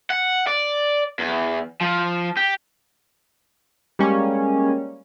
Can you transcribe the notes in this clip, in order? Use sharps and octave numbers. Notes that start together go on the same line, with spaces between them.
F#5
D5
E2
F3
G4
G3 G#3 A#3 C#4